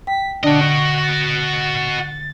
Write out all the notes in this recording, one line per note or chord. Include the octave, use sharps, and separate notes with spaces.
G5 B6
D3 D4 F#4 D#5
C#6
A6